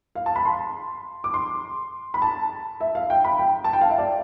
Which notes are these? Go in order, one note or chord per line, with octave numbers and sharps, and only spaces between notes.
F5
A5
B5
C6
D6
C6
B5
A5
E5
F5
G5
B5
G5
A5
G5
F5
E5
D5